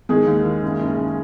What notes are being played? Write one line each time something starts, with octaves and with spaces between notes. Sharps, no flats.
D#3 G#3 G#4
D#2
D#3
F#1
F#1
F#1